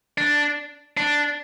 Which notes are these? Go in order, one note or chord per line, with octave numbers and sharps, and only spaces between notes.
D4
D4